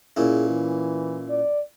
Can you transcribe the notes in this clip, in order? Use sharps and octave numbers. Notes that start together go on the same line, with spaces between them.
A#2 C#4 E4 G#4
E3
D5